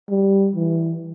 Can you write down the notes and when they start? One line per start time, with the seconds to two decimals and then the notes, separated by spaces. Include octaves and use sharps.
0.10 G3
0.55 E3